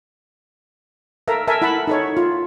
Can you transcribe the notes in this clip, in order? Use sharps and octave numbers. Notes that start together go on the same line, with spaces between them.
A4 A#4 E5 F5 A#5
A4 A#4 E5 G#5 A5
E4 E5 F#5 A5 B5
D#4 A4 C#5
F4